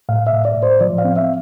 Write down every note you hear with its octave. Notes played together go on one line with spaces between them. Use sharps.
A2 F5
E5
A2
D5
A2
C5
F3 D5
F5
C4
E5